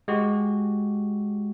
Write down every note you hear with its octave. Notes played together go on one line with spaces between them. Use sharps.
G#3 F#4 G4